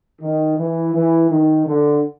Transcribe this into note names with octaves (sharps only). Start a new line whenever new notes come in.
D#3
E3
E3
D#3
D3